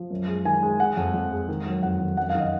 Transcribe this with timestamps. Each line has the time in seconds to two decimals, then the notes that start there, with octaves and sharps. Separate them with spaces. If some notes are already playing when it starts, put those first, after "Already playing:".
Already playing: F3
0.10 F#2
0.27 G#3
0.45 D#3 G#5
0.63 G#3
0.80 G#3 F#5
0.97 F2
1.14 F2
1.31 G#3
1.48 D#3
1.66 F#3
1.83 F2 F#5
2.00 D#3
2.17 F#2 F#5
2.30 F5
2.35 D#3
2.40 D#5